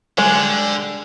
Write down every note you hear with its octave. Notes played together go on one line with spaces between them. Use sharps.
D3 G3 G#3